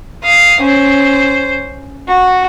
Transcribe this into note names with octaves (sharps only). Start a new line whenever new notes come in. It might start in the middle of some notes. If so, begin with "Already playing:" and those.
F5 D#6
C#4 C5
F#4